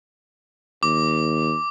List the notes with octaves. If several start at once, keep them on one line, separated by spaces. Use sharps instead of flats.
D#2 D6